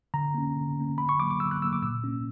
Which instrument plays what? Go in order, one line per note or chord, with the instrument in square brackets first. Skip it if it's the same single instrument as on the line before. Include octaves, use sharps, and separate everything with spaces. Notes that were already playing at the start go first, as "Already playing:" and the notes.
[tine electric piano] D3 A#5
A#3 C#4
D3
A#3 C#4
D3 B5
C#6
F#3 A#3 D6
D6
D3 E6
F#6
F#3 A#3 E6
D6
A#2 E6
A#3 C#4